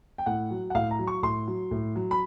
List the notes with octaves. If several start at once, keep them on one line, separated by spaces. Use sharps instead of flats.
G5
A2 F#5
F#3
F#5
A2 F5
A#5
F#3
C#6
A2 C6
F#3
A2
F#3
B5